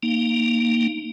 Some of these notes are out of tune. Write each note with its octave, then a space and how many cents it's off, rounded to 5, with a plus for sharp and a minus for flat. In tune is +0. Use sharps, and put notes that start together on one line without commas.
A#3 +0 D#4 +0